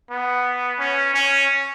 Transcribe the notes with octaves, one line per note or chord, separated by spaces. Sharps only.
B3
C#4
C#4